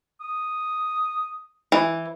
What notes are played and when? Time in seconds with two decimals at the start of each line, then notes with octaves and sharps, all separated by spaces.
0.21 D#6
1.72 E3